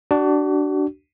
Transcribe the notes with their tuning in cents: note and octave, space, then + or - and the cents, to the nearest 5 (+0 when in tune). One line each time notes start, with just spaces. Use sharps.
D4 +0 F#4 +35